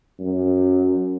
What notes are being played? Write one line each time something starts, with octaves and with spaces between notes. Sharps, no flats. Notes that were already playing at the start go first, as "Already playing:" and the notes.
F#2